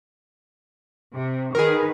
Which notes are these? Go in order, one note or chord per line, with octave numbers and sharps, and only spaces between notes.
C3
D#3 G#4 A#4 B4